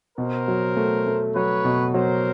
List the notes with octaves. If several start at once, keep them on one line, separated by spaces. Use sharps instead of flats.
B2 A#4 C5
F#3
A3
A3
F#3 B4 C#5
B2
F#3 A#4 C5